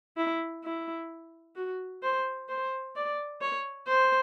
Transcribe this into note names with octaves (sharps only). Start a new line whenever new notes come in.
E4
E4
F#4
C5
C5
D5
C#5
C5